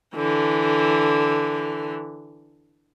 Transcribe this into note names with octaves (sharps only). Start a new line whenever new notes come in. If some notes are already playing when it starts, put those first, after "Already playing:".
D3 E3